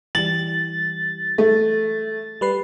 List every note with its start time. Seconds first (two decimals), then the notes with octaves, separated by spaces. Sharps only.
0.15 E3 G3 A6 F#7
1.38 A3
2.41 G3 B4 C7